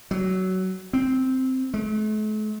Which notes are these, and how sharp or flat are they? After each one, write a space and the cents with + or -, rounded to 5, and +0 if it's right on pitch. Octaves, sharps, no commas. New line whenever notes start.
F#3 +15
C4 -5
A3 -45